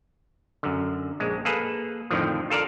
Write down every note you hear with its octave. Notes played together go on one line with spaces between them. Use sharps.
F#2 D3
A#1 G#3
A#3 G#4 A4 B4
F2 A2 D3 D#3 F3
F4 A4 A#4 D5 F5